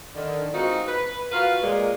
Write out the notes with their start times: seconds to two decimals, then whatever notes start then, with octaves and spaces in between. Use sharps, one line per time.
0.15 D3 D#3
0.53 G#3 C4 D#4 F4 F#4
0.87 B4
1.32 F4 F#4 A#4 B4 F5
1.62 A#2 G#3